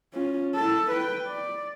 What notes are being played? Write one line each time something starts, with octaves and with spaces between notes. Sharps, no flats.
C#4 F4
E4 A4
B4 G5
D5